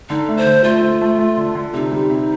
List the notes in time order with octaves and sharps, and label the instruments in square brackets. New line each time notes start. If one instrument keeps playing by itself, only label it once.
[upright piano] D3 [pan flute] D#4
[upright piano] A3
[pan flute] C5
[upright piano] D3
[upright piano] A3 [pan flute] F4
[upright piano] A3
A3
A3
D3
D3
[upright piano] C3 [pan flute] D#4
[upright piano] G3
C3